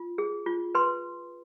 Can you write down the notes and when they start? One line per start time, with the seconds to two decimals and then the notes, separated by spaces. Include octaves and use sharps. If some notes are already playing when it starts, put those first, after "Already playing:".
Already playing: F4
0.18 G#4
0.46 F4
0.75 B4 C6